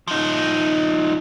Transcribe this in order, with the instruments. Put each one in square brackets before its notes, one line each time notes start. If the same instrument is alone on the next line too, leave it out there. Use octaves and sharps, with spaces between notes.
[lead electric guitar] F3 D#4